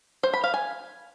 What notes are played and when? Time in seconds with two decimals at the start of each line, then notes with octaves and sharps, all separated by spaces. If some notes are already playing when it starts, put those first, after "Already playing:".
0.23 C5
0.34 B5
0.44 F5
0.54 G#5